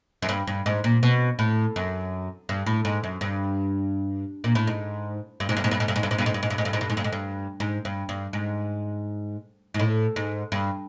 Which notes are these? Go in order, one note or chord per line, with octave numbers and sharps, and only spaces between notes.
F#2
G2
G2
G#2
A#2
B2
A2
F#2
G2
A2
G#2
F#2
G2
A#2
A2
G#2
G2
G#2
G2
G#2
G2
G#2
G2
G#2
G2
G#2
G2
G#2
G2
G#2
G2
G#2
G2
G#2
G2
G#2
G2
G#2
G2
G#2
G2
G2
G#2
G#2
A2
G#2
G2